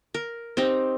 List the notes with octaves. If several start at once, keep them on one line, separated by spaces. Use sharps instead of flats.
A#4
C4 D#4 G4 A#5